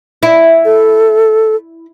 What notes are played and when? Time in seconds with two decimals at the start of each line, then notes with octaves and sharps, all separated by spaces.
0.23 E4
0.65 A4